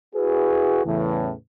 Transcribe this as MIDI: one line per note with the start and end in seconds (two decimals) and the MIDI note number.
0.15 0.82 64
0.15 0.82 66
0.15 0.82 68
0.15 0.82 71
0.85 1.32 40
0.85 1.32 45
0.85 1.32 49
0.85 1.32 52